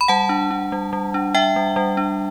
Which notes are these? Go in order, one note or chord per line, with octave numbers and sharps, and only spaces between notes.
B5
G3 F#5 A5
D4
D4
G3
G3
D4
D4 E5 G5
G3
G3
D4